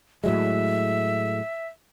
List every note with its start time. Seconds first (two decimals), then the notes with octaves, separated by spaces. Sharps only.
0.24 A2 F#3 G#3 E5